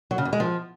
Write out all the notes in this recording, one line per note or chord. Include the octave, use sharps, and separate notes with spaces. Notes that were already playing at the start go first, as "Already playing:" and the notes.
F#3
C#3
E2
G#3
F3